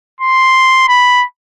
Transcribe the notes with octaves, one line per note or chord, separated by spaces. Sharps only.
C6
B5